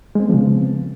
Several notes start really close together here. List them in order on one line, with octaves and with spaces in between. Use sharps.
G#3 C4 B3 F3 C#3